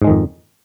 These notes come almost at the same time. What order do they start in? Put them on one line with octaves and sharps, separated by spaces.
G#2 G#3 D#3 F2